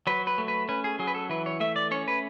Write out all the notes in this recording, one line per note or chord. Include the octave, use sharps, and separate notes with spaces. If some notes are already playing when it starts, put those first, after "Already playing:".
F#3 B4
B4
A3
B4
C#4 B4
G#4
F#3 G#4
B4
A4
E3 B4
C#5
A3 E5
D5
C#4 C#5
B4